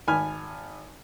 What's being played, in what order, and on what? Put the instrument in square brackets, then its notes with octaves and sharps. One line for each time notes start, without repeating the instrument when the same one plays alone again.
[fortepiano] G#1 G#5 B5 F6